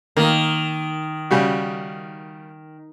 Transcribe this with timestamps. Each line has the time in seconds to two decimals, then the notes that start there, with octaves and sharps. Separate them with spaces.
0.17 D#3 A#3
1.31 C#3 G3 F#4